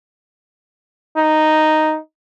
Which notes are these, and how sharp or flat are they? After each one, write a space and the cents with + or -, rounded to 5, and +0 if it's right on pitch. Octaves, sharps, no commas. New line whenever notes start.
D#4 -5